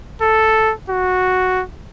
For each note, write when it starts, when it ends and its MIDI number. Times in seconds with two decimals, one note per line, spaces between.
0.22 0.73 69
0.89 1.63 66